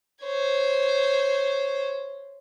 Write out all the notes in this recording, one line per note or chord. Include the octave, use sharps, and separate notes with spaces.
C5 C#5